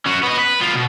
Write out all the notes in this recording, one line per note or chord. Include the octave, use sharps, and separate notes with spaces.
C#4 F#4
B3 D#5
B4
B3 F4
B2